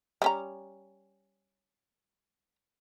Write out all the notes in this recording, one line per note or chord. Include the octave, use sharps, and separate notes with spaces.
G3 C#4 A#5